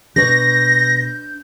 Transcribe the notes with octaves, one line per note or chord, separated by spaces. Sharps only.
B2 D4 B4 C#5 G6 A#6